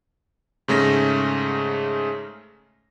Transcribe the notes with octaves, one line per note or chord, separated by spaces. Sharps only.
G#2 C#3 A3 C#4 A#6